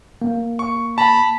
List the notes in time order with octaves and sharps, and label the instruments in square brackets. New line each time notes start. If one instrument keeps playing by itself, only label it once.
[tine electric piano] A#3
[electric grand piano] C#6
[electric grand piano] A5 [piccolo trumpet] B5